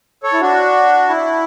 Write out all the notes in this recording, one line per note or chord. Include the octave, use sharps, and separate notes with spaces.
A4 C#5
E4
D4 F#4
E4